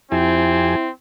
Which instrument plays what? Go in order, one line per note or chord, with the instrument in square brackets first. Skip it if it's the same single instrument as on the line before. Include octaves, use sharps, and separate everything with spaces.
[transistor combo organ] F2 G4 G#5 [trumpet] C4 [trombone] E4